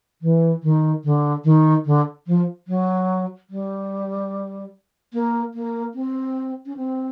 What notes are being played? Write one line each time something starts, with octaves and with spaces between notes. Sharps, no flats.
E3
D#3
D3
D#3
D3
F3
F#3
G3
A#3
A#3
C4
C#4
C4